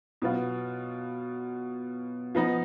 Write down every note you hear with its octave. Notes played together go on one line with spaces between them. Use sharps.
B2 F#3 B3 F4
F3 B3 D#4